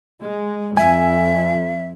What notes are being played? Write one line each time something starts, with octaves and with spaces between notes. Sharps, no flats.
G#3
F2 E5 G#5